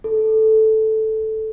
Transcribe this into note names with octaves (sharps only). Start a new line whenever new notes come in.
A4